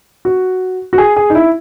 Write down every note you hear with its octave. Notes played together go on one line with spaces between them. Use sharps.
F#4
F#4
G#4
G#4
D#4
E4